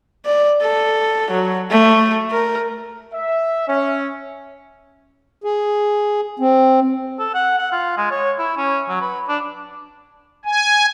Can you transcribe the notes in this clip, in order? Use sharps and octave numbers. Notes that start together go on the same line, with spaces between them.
D5
A4
F#3
A3
A#4
E5
C#4
G#4
C4
A4
F#5
F#5
F4
G#3
C#5
E4
C#4
F#3
B4
D4
G#5